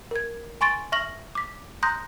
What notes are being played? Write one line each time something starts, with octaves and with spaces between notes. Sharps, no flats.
A#4 G#6
G#5 C6 C#6 A6 D7
E5 C#6 F6 A#6 F#7
D6 B6
A#5 C6 D#6 F#6 G6 A#6